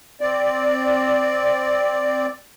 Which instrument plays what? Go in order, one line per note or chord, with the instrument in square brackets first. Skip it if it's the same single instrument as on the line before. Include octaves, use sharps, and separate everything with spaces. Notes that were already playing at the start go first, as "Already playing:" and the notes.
[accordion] C4 D5